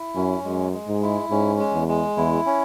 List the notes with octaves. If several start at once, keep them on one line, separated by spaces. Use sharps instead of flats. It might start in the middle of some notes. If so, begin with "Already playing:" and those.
Already playing: E4
F#2 C#4
F#2 G#3
G#3
G#2
E4
G#2 C#4
G#3
E2
G#3
E2 E4
C#4